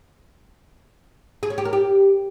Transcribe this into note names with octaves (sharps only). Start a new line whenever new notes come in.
G#4
C#4
G4
A#4
G4